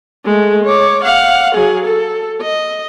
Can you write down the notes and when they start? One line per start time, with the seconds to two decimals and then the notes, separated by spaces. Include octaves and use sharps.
0.25 G#3 A3
0.63 C#5 D6
1.04 F5 F#5
1.55 F#3 G#4
1.86 A4
2.42 D#5